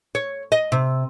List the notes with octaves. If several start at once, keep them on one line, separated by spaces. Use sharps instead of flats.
C#5
D#5
C3